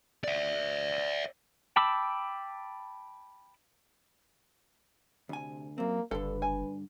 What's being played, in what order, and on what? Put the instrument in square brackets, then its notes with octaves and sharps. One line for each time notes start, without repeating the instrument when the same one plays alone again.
[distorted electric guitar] D5 E5
[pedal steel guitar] G5 A5 B5 D6 E6
[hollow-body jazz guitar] D2 G#5 [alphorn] C3
[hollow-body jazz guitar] F#2 C4 [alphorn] A#3
[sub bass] F#1 [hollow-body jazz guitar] G2 D3 [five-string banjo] A4 [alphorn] B4
[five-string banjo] G#5